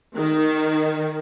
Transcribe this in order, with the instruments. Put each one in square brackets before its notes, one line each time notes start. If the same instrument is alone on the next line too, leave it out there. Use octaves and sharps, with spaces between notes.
[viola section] D#3